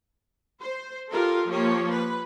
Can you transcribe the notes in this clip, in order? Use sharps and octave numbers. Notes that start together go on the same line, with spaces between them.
C5
F4 G4 A4 A#4
F3 A#3 G4 C#5
B4